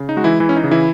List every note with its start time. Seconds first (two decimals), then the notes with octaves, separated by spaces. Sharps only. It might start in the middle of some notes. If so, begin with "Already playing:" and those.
Already playing: C#3
0.09 D#4
0.16 G#3 F#4
0.24 E3 E4
0.40 E3 E4
0.49 C#4
0.56 D#4
0.64 C#3
0.71 E3 E4